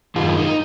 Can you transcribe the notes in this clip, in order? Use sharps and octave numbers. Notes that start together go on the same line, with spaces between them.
F#2 D#3 G#3 D#4 F4
D#4